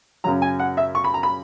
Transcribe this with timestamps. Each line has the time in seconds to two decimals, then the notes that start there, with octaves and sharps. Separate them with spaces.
0.24 F#2 C#3 F#3 A#5
0.42 G#5
0.59 F#5
0.77 E5
0.95 C#6
1.04 B5
1.14 A#5
1.23 B5